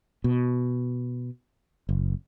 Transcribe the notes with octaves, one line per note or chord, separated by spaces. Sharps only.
B2
F#1